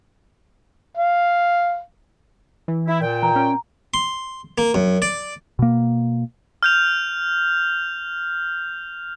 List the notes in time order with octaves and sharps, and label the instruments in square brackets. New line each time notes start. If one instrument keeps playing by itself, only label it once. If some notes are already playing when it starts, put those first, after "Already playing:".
[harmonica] F5
[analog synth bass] E3
[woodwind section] E4
A#2 G5
[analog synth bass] E3 [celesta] A#5
[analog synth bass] C#4
[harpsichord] C6
A#3
F#2
D5
[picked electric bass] B2 A#3
[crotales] F6 G6 F7